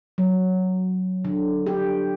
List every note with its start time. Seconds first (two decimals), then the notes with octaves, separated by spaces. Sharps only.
0.18 F#3
1.25 D3
1.67 G4